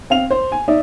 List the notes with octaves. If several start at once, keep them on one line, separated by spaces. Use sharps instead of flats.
C4 F5 F7
C5
G#5
D#4 D5 E5